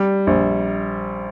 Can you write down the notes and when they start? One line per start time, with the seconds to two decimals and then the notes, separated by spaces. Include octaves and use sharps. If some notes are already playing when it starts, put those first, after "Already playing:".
Already playing: G3
0.27 A#1